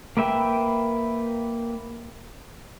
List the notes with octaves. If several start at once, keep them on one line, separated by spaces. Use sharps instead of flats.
A#3 B4 E5 G5